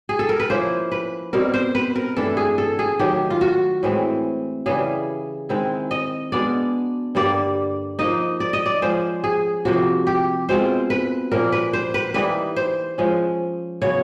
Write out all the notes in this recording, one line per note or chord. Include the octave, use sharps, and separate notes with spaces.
G#4
A4
A#4
B4
F3 A#3 C#4 E4 C5
B4
B2 G3 C4 A#4
C5
B4
A#4
G2 E3 A3 D4 A4
G#4
A4
G#4
D#3 F#3 A3 G4
F4
F#4
A2 E3 G#3 C4
C#3 E3 G3 G#4
D#3 G#3 C4 E4
D#5
B2 G#3 B3 D4 D5
G2 D3 G3 A#3 D5
F3 A#3 D#4 D#5
D5
D#5
D5
F3 G#3 C#4 C5
G#4
C3 F3 A#3 F#4
G4
B2 G#3 C4 F4 C5
B4
A#2 F3 A#3 C#4 A#4
B4
C5
B4
E3 G3 A#3 D#4 B4
C5
F3 G#3 C#4
C#3 F#3 B3 E4 C#5